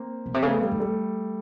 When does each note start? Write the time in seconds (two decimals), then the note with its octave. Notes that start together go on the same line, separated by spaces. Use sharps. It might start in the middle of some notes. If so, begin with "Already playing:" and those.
Already playing: A#3 C4
0.26 B2
0.34 C3
0.42 C#3 A3 B3
0.62 G3 A3
0.71 D#3
0.80 G3 A3